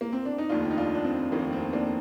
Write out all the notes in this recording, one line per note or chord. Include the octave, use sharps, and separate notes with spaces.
A#3
C4
D4
D#4
F1 D#2 D#3 D4 F4
D#4
D4 F4
D4
C4
F1 D#2 D#3 A#3
C4
A#3 D4